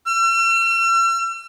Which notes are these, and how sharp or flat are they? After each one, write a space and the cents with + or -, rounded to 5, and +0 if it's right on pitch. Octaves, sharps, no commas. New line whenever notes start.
E6 +45